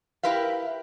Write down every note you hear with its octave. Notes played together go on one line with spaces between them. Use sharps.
E4 G4 A#4 B4 E5 F5